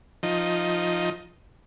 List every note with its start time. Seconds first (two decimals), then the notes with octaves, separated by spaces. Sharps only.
0.23 F3 D#4